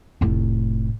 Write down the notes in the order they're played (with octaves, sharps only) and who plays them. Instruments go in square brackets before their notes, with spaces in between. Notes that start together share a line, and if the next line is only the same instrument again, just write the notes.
[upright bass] F1 A2